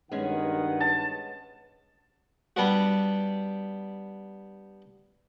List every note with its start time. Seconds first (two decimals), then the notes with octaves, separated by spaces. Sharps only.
0.12 G2 D#3 G#3 B3 C#4 F#5
0.80 A5
2.56 G3 B3 D4 F#4